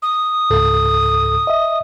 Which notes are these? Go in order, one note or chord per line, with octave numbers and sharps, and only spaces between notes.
D#6
C#2 G#2 A4
D#5 E5